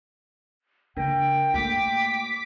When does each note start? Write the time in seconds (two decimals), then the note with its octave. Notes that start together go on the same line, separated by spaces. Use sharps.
0.97 C#3 D4 A#4 G5 A#6
1.54 A3 A#3 F#4 D6 B6